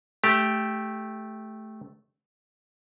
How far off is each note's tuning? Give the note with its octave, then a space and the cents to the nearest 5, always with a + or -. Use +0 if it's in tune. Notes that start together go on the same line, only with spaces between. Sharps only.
A3 -10 G4 +0